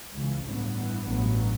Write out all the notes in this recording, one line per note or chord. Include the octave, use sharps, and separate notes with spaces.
C#2 C#3 E3
A1 G2 F#3 B3
G2 E3 B3
A1 G2 F#3 B3